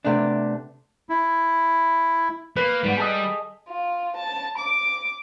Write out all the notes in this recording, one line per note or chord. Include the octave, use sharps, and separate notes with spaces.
C3 A3 B3 D4
E4
A#3 B4
G#2 G3 B3
G#4 A4 D#5
F4
A5
D6